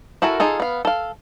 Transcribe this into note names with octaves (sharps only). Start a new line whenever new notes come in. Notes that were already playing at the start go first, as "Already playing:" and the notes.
E4 F#4 A4 A#4 G#5
D#4 F4 G#4 A4
B3 F5
A4 F5